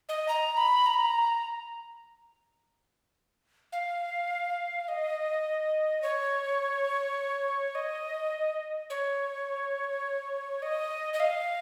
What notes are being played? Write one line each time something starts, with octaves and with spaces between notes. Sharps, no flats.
D#5
A#5
B5
A#5
B5
A#5
F5
D#5
C#5
D#5
C#5
D#5
D#5
F5